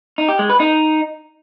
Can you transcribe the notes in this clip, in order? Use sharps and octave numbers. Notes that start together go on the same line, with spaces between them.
D#4
G4
G#3
B4
D#4